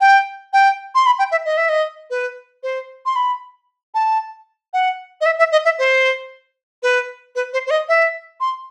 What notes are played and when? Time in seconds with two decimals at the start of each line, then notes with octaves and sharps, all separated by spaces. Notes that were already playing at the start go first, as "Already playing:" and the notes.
0.01 G5
0.53 G5
0.95 C6
1.06 B5
1.19 G5
1.31 E5
1.46 D#5
1.57 E5
1.69 D#5
2.10 B4
2.63 C5
3.06 C6
3.16 B5
3.95 A5
4.73 F#5
5.21 D#5
5.26 E5
5.39 E5
5.52 D#5
5.65 E5
5.79 C5
6.83 B4
7.35 B4
7.53 C5
7.67 C5
7.71 D#5
7.89 E5
8.40 C6